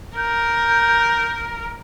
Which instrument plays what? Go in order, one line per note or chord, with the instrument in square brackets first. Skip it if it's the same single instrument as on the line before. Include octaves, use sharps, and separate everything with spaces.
[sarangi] A#4 [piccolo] G6